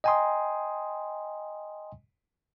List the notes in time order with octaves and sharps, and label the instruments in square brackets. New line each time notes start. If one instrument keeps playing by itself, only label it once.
[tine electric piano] D#5 G5 G#5 A#5 C6 D#6